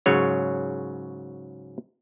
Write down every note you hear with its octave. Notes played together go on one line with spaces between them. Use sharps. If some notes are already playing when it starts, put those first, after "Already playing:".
G#2 C#3 F#3 C#5